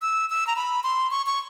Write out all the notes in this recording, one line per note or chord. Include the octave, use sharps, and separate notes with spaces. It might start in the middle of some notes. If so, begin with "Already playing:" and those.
E6
E6
A#5
B5
C6
C#6
C#6